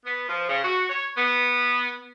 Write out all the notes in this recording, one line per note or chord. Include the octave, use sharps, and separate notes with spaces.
B3
F3
C#3
F#4
C#5
B3